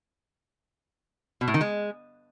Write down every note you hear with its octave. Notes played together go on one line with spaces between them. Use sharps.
B2
A2
D#3
G#3